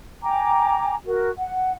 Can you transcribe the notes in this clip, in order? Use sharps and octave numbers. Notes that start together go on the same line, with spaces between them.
G5 G#5 A#5 D6
F#4 A#4
F#5